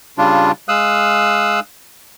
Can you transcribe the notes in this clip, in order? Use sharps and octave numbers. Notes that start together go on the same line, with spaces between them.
C#3 G3 D4 F4
G#3 F5 D#6 E6 F#6